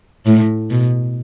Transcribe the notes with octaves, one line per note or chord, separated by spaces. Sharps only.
A2
B2